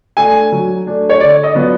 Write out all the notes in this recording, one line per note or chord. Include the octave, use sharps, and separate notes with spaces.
A3 D4 G#5
F#3
A3 D4
C#5
D3 D5
D#5
F#3 B3 D4 F4